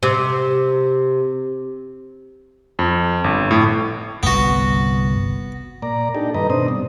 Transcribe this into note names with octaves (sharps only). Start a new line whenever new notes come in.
C3
F2
G1
A2
G1 C2 B3 F#4
A#2 D5 A#5
D4 D#4 G4 A4
G2 D#3 B4 D#5 A#5
B2 C4 D4 C5 D#6
G2